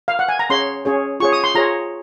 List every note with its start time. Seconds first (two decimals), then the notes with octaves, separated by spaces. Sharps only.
0.08 F5
0.19 F#5
0.29 G#5
0.39 A#5
0.50 C#4 G#4 C#5 C6
0.85 C#4 G#4 C#5
1.20 F4 G#4 C#5 C#6
1.32 D#6
1.44 C6
1.55 F4 G#4 C#5 A#5